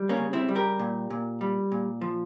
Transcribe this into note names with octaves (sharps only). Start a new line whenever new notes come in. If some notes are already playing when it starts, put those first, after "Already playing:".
Already playing: G3
A#3 C#4
C#3
C4 E4
G3
G4 A#4
A#2
A#2
G3
A#2
F3